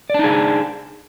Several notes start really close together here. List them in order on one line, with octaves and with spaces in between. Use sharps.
D5 D4 D#4 G#4